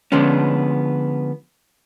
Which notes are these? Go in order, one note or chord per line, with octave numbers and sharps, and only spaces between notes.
D3 F3 G#3 B3 C#4